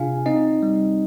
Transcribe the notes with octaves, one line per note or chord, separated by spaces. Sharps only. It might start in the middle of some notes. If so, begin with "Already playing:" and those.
Already playing: C3 D4 F4 G#4 F5 G#5
C4 D#4 D#5
G3